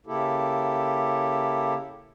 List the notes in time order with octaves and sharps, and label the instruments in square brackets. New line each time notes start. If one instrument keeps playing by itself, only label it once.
[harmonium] C#3 A#3 E4 G4 A4